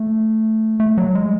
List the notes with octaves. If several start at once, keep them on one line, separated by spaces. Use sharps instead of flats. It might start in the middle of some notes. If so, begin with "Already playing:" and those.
Already playing: A3
A3
F#3
G#3